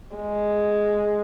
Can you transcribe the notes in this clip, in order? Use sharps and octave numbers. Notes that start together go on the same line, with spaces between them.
G#3